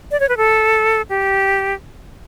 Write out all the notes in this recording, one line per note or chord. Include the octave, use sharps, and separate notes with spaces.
D5
C#5
B4
A4
G4